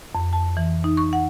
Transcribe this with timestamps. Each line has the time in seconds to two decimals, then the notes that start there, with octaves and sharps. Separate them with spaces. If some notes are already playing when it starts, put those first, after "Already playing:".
0.15 F2
0.33 A5
0.57 E3
0.84 D#4
0.97 C#6
1.13 F#5